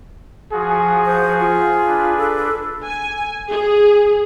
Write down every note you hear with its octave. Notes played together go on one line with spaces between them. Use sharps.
F3 F#4 G#4
C5
F4
D4 B4
A4
G#5
G#4